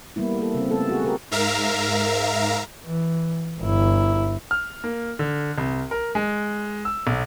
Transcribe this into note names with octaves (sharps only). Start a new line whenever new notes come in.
G3 A#3 B3 E4
A#3 A4
C#3 C4
A3 B3 A4
F#4 G#4
F#4 G4 A#4
G#2 A#4 E5 F5 A#5
E3
G1 E4
F6
A#3
D3
C2
A#4
G#3
E6
B1